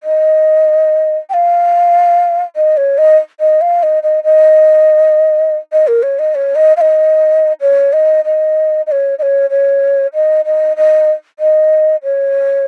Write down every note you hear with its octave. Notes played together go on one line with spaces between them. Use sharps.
D#5
G5
F5
D#5
C#5
D#5
D#5
F5
D#5
D#5
D#5
D#5
A#4
C#5
D#5
C#5
D#5
F5
D#5
C#5
D#5
D#5
D#5
C#5
D#5
C#5
C#5
D#5
D#5
D#5
D#5
C#5